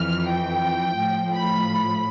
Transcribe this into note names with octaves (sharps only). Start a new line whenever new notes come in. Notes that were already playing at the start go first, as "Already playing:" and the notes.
Already playing: F2 E3 F6
G5
A2 F3
B5